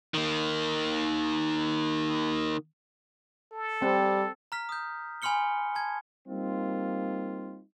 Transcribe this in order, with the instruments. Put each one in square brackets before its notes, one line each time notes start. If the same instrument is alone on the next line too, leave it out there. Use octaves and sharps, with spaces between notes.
[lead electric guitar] D#3 A#3
[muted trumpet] A4
[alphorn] G3 [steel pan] C4
[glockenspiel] A#5 F6 B6
D#6 G6
G#5 B5 C6 F6 C#7 G7
A5 G#6
[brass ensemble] G3 A#3 C4 D#4 F4